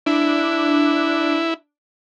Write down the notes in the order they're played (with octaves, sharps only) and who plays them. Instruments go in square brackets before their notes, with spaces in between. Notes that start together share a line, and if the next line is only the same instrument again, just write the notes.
[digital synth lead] D4 [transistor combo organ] E4